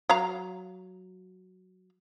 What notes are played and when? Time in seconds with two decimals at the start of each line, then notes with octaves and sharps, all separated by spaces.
0.10 F#3 F5 A#5